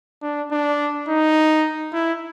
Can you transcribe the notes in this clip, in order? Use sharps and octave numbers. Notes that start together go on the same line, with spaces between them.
D4
D4
D#4
E4